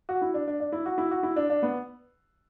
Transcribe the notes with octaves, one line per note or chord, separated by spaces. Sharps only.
F#4
E4
D4
D4
D4
E4
F#4
E4
F#4
E4
D4
D4
B3